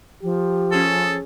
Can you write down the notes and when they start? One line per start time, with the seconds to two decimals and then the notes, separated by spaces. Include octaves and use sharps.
0.23 F3 G4
0.71 C#4 G#4 A4